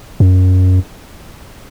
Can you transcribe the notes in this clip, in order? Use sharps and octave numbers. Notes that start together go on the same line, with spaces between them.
F#2